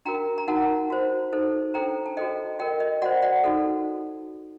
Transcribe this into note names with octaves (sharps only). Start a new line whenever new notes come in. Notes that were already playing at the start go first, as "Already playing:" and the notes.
D4 F#4 A#4 G5 A#5
A#5
D#4 F#4 A#4 F#5 A5
F#4 C5
D#4 A4 C5
D4 A4 C5 G5 A#5
A5
F#4 A4 C5 D#5 G5
F#4 A#4 D#5 G5
D#5
F#4 C5 D5 F#5
D5 F#5
D#4 F#4 A4